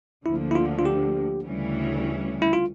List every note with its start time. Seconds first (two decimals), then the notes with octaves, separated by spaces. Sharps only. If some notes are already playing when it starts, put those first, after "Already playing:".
0.25 D2 D3 F3 A#3 E4
0.51 E4
0.55 F4
0.79 F4
0.85 G4
1.45 D2 C#3 E3 G3 C#4
2.42 E4
2.53 F4